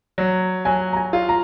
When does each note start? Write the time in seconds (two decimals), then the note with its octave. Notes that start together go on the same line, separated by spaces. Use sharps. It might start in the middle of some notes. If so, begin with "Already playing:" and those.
0.18 F#3
0.65 F#3 G#5
0.93 A#5
0.97 G#5
1.13 F4
1.29 A#5